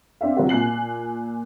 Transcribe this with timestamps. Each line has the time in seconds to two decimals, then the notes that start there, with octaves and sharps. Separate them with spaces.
0.21 C4 D4 E5 F5
0.37 C3 F#3 C4 F4 F#4
0.49 A#2 G#5 F#6 C7 F#7